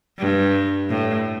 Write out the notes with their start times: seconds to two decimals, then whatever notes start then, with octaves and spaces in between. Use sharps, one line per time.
0.18 G2
0.90 A2